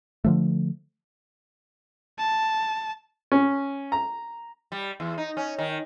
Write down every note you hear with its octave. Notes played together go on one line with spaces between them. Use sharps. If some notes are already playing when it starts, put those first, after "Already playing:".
D3 F3 A3
A5
C#4
A#5
G3
E2
D#4
C#4
D#3